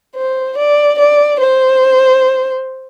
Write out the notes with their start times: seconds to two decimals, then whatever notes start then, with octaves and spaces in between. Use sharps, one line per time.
0.15 C5
0.57 D5
0.99 D5
1.40 C5